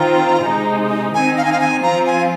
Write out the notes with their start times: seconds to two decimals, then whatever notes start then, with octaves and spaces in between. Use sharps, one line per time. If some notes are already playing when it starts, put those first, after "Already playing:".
Already playing: D#3 C4 F4 A#5
0.45 C3 G#3 D#4
1.14 D#3 C4 D#4 G#5
1.37 F5
1.45 G#5
1.53 F5
1.60 G#5
1.83 F3 C4 F4 A#5
2.06 G#5